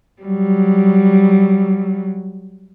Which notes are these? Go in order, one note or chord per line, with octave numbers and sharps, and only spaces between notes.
F#3 G3